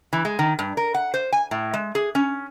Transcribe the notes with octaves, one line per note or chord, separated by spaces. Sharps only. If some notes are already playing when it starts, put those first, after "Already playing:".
E3
G#3
D#3
G2
A#4
F#5
C5
G#5
A2
G#3
G#4
C#4